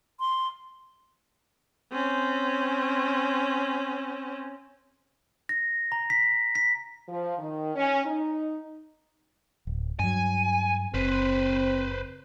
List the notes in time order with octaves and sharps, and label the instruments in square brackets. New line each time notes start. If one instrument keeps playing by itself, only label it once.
[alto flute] C6
[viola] C4 C#4
[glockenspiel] A#6
A#5
B6
B6
[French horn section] F3
D#3
C#4
D#4
[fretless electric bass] D1
[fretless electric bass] G2 F#3 [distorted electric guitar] G#5
[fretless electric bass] F#1 [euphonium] C4 [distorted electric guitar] B4 C5